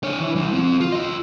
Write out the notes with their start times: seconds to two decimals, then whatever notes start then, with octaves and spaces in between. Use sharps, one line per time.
0.03 D4 C#5
0.20 E3 E4
0.36 G3 E4
0.53 F3 C4
0.80 F4
0.92 F4 D#5